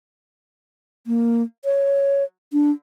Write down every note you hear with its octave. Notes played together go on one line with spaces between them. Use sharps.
A#3
C#5
D4